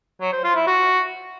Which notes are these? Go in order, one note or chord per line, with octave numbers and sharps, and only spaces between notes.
F#3
C5
F4
E4
F#4